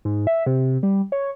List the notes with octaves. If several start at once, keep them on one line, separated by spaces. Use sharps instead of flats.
G#2
E5
C3
G3
C#5